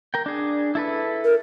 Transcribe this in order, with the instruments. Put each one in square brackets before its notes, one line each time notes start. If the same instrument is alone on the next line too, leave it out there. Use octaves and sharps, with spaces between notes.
[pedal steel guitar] A#4 G5
D4 G#4
E4 A4 B4
[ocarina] A#4